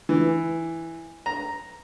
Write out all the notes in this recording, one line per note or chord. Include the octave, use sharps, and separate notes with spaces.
E3
A#5